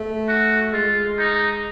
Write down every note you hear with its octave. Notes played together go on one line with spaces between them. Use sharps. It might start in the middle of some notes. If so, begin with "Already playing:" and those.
Already playing: A3
F#4
G#3 F4
D#4